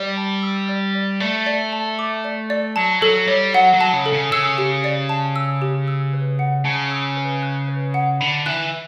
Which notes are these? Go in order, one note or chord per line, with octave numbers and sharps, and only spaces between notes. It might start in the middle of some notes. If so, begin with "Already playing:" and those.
Already playing: G3 D5
A5
E6
D5
D5
A3 D5
D5
A5
D6
D5
D5
F#3 A5
F#3 A4
G3 C#5
F#3 F#5
F#3
A5
C#3
A4
C#3
C#3 E6
G4
D5
A5
E6
G4
E6
B4
F#5
C#3 A5
E6
B4
F#6
B4
F#5
D3 B5
E3 F#6